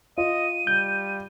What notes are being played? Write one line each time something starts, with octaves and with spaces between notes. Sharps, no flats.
F4 D#5 D#7
G3 G6